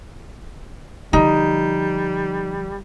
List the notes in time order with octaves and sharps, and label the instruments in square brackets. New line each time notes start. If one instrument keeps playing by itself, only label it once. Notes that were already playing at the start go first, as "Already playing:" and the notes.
[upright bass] D3 F3 [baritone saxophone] G3 [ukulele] D#4